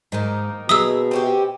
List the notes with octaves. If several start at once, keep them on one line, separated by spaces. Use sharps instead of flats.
G#2 D#3 A#3 D#4
B2 G#4 E5 A#5 D#6 E6
C4 C#4 G4